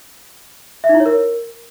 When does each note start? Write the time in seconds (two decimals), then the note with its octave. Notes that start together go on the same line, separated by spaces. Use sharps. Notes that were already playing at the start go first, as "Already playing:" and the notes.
0.84 E5
0.89 D#4
0.95 E4
1.00 C#5
1.06 A#4